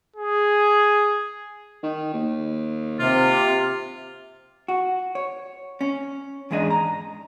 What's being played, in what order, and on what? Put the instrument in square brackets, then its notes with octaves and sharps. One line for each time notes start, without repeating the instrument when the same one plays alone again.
[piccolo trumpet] G#4
[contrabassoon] D#3
D#2
[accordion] C3 [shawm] F4
[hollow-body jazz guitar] F#4
C#5
C#4
E2 G#2 G#3 D4 D#5
A#5